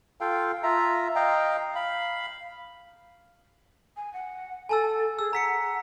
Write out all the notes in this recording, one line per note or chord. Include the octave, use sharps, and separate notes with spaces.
F4 A4 F5 G5
F4 E5 A#5
D#5 F5 G5 A#5
F5 B5
G#5
F#5
A4 G#5 A5 E6
G#4 E6
F#5 A#5 B6 C#7